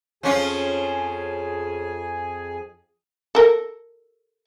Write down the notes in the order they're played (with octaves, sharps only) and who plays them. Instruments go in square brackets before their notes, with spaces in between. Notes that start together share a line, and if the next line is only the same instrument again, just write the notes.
[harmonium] F2 G#4 G#5 [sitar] F3 C#4 F4
[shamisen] A4 A#4